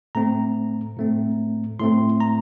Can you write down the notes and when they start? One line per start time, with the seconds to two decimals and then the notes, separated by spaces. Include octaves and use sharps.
0.15 A2 A3 C4 A#5
0.97 A2 A3 C4
1.79 A2 A3 C4 C6
2.20 A#5